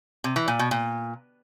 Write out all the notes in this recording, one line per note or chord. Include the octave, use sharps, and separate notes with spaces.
C3
E3
A#2
B2
A#2